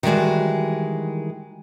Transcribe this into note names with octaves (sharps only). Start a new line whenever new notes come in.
D#3 E3 G3 G#3 F#4